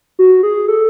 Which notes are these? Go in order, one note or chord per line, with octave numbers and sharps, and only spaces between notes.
F#4
G#4
A4